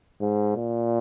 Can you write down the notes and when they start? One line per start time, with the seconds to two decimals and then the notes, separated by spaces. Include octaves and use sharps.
0.21 G#2
0.56 A#2